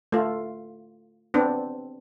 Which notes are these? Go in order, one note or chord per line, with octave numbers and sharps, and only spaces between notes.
A3 F4
B3 C4 D4